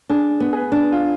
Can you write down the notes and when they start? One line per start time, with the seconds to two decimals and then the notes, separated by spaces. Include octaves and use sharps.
0.09 D4 G#4
0.40 B3
0.53 G#4
0.56 B4
0.72 D4
0.92 F4